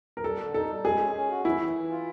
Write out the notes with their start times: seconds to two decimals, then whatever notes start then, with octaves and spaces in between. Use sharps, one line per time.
0.17 A#4
0.23 G3 A4
0.39 D3
0.54 D#4 A4
0.69 G3
0.84 G#3 G#4
1.00 C#4
1.15 C#4
1.30 F#4
1.45 E3 E4
1.60 E3
1.76 E3
1.91 F4